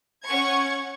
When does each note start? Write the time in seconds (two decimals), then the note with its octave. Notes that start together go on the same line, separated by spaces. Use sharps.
0.24 C#4 F#5 C#6 G#6